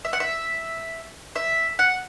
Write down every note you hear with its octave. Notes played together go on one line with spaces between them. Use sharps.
E5
F#5
E5
E5
F#5